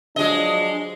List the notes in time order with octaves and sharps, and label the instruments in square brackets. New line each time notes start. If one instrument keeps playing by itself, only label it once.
[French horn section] F3 F#3 D4 [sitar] G#3 D#5